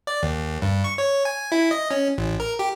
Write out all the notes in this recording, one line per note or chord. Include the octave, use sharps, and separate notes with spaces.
D5
D#2
G2
C#6
C#5
G#5
E4
D#5
C#4
A1
A#4
G4